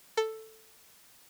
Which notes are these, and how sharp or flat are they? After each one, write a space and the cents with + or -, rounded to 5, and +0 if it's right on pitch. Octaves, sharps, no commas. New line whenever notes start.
A4 +5